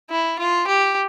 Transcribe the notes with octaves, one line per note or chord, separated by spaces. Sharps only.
E4
F4
G4